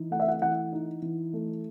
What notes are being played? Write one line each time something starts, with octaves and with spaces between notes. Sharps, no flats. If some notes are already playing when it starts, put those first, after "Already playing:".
Already playing: E3 D#4
A3 F#5
E5
F#5
E3 F#5
D#4
E3
A3